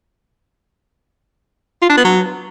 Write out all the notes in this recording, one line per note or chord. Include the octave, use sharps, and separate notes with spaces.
F4
D4
B3
F#3